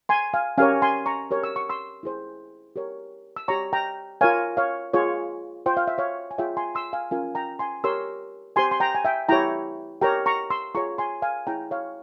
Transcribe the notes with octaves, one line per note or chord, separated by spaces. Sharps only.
G#5 C6
F5 G#5
C#4 G4 A#4 C#5 F5 G#5
G#5 C6
A#5 C#6
G4 A#4 C#5
E6
C#6
C6 E6
E4 G#4 C5
G4 A#4 C#5
E6
G4 C#5 A#5 C#6
G5 A#5
F4 A#4 C#5 F5 G#5
C#5 F5
F4 G#4 C#5
F4 C5 G5
F5
E5
C#5 F5
G#5
F4 G#4 C#5 E5 G5
G#5 C6
C6 E6
F5 G#5
C#4 F4 A#4 F5 G#5
G5 A#5
G#5 C6
G4 A#4 C#5 C6 E6
G4 C5 G#5 C6
C6
G5 A#5
G#5
E5 G5
E4 G4 C#5 G5 A#5
G4 A#4 C#5 G5 A#5
A#5 C#6
C6 E6
F4 G#4 C#5 A#5 C#6
G#5 C6
F5 G#5
E4 G#4 C#5 G5 A#5
C#5 F5